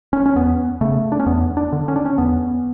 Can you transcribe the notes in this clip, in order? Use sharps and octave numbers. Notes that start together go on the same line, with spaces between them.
C#4
C#4
E2 B3
C#3 A3
D4
C#4
E2 B3
D4
D3
C#4
D4
C#4
E2 B3